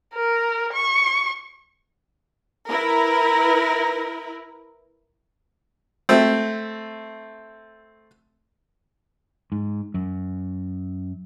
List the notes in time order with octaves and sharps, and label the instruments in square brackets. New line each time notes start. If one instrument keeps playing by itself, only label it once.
[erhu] A#4
C#6
[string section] E4 A#4 B4
[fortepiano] A3 C4
[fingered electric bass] G#2
F#2